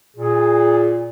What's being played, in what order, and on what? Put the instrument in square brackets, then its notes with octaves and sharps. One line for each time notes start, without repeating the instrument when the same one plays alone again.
[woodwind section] A#2 [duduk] G#4